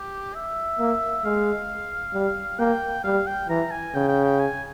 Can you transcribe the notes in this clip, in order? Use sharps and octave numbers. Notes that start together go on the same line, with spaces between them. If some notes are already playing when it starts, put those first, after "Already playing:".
Already playing: G4
E5
A#3
G#3 F5
G3
A#3 G5
G3 F5
G5
E3 A#5
G#5
C#3 G5
G5
G5
G#5